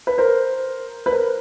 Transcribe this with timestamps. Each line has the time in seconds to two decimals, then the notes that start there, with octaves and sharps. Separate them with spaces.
0.07 B4
0.18 A#4 C5
1.06 B4
1.11 A#4 C5